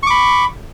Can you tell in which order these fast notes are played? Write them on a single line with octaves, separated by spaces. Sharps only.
C#6 D6 B5